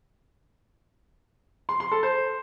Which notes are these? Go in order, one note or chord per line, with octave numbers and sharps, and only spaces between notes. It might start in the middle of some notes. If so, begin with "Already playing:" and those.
C6
C6
A4
C5